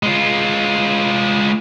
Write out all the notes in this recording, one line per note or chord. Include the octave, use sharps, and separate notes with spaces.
G#3 F4